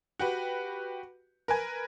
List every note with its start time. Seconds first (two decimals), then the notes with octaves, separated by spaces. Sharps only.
0.19 F#4 G4 B4
1.48 A#4 B4 G#5